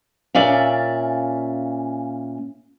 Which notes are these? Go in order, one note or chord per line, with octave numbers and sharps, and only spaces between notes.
A#2 C#4 D5 E5 F5